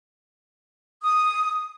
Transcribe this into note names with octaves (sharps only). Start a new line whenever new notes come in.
D#6